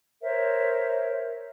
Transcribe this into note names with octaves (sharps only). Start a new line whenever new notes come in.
A#4 C5 C#5 E5